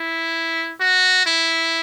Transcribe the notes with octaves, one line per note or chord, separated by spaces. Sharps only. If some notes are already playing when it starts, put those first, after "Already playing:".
Already playing: E4
F#4
E4